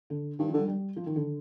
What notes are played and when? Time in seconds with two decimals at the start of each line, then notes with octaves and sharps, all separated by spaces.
0.10 D3
0.39 G2 D#3
0.48 F3
0.54 D3 G3
0.68 G3
0.96 F3
1.06 D#3
1.16 D3